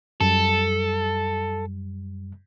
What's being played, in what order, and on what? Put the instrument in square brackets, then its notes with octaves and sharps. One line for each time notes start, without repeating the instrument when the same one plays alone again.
[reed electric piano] F#2 G3 [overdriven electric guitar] A4